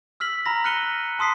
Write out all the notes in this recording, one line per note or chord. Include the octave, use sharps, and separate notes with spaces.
E6 F6 B6 F#7
A#5 B5 A#6
F6 F#6 A#6 C#7 D#7 G7
A5 C6 D#6 B6 C7